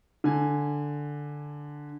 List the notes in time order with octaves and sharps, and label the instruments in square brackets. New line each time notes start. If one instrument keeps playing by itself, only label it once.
[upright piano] D3 G#5